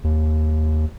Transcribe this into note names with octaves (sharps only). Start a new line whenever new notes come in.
D#2